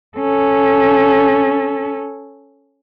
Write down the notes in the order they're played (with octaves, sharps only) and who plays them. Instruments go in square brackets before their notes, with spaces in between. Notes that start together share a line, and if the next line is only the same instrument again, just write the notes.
[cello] C#4 A4